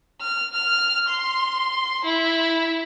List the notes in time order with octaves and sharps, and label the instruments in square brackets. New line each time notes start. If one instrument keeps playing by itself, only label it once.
[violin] F6
F6
C6
E4